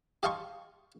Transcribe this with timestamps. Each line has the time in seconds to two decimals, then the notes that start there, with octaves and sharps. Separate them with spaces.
0.23 G4 D#5 F5 A5 C6 C#6